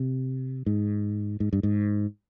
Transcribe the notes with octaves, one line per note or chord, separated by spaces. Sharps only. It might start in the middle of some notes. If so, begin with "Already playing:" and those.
Already playing: C3
G#2
G#2
G2
G#2